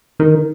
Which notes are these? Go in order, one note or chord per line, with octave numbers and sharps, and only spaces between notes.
D#3